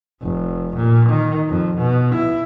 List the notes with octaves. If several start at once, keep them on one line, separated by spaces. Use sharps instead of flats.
F1
A#2
D#3
F2
B2
E4